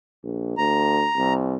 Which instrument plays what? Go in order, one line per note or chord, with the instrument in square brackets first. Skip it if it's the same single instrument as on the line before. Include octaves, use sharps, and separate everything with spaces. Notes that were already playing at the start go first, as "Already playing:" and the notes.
[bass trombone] A#1
[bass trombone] D2 [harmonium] A#5
[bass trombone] C2